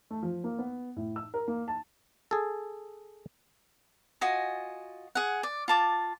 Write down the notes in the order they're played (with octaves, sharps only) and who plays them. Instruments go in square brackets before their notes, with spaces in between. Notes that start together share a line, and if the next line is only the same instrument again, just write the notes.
[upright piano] A3
F3
A#3
B3
A2
E6
A#4
A#3
A5
[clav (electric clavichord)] G#4 A4
[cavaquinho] F4 F#4 D#5 G#5
G#4 F#5
D5
F4 A5 D6